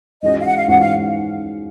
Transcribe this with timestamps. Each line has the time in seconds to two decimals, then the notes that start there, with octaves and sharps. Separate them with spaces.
0.22 G#2 E3 G#3 C#4 F#4 D#5
0.41 F5
0.46 F#5
0.56 F5
0.68 G#2 E3 G#3 C#4 F#4 F#5
0.80 F5